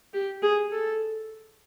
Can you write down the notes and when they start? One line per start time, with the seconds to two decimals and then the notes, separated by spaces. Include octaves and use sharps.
0.14 G4
0.42 G#4
0.72 A4